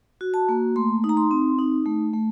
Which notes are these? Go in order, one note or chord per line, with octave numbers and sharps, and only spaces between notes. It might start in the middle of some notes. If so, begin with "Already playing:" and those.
F#4
A5
A#3
A3 C6
D#4
A#5
C6
C4
D#4
A3
A3